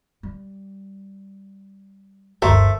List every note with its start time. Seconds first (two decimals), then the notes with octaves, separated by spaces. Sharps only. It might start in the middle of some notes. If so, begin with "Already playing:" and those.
0.23 G3
2.42 G1 D2 A3 A#4 C5